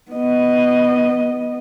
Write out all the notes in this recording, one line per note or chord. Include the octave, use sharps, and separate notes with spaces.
B3 D#5